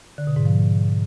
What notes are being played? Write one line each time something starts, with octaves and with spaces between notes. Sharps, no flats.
D3
B2
G#2
F3